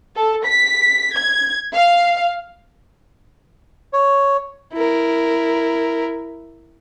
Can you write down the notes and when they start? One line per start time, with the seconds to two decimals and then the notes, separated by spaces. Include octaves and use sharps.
0.16 A4
0.44 B6
1.14 G#6
1.75 F5
3.93 C#5
4.73 E4 A#4